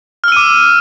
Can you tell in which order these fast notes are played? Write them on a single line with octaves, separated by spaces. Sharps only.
F6 E6 D#7 D6